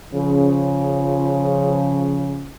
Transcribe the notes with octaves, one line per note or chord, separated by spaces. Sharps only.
C#3 F3